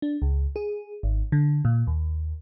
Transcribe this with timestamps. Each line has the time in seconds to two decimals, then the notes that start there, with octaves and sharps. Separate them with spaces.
0.02 D4
0.22 C#2
0.56 G#4
1.03 G#1
1.32 D3
1.65 A#2
1.87 D#2